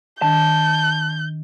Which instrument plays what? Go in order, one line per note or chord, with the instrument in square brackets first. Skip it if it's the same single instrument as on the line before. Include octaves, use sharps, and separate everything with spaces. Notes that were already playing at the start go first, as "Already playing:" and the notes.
[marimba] D#3 D4 [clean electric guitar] A5 [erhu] G6